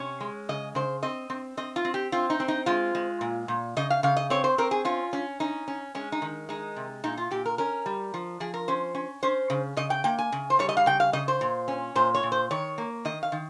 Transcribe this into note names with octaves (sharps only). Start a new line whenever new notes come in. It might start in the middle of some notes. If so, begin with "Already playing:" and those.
Already playing: C3 C#4 C#5
G#3
C#3 D#5
C#3 C5
C4 D#5
C4
C4 D#5
F4
C4
G4
C4 F4
D#4
C4
D#4
G#3 F4
G#3
A#2
A#2
C#3 D#5
F5
C#3 F5
D#5
C4 C#5
C5
C4 A#4
G#4
C#4 F4
C#4
C#4 D#4
C#4
G#3 C#4
D#4
D#3
G#3 D#4
C3
A#2 D#4
F4
A#2 G4
A#4
C#4 A#4
G3
F3
F3 G#4
A#4
C#4 C5
C#4
C#4 C5
C#3
C#3 D#5
G5
A#3 G5
G#5
C#3
C5
G3 C#5
D#5
F5
C#3 G5
F5
C#3 D#5
C5
A#2
C#4
A#2 C5
C#5
A#2
C5
D#3 C#5
A#3
D#3 D#5
F5
D#3